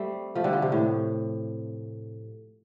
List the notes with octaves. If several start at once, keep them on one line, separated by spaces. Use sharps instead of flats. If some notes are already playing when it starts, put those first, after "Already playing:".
Already playing: G3 A3 C4
F3 A3
D3 G3
F3
C3
A2